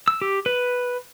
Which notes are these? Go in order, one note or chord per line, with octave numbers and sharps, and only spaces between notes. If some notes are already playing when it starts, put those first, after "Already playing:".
E6
G4
B4